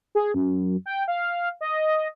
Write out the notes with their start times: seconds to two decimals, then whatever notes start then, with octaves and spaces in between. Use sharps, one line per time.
0.15 G#4
0.34 F#2
0.86 G5
1.08 F5
1.61 D#5